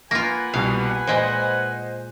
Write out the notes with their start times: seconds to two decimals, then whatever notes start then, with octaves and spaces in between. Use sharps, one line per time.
0.11 A#3 F4 B4 F#5 G#5 A#6
0.54 C2 B2 G3 F5
1.07 A#2 G#3 C5 D#5 F#6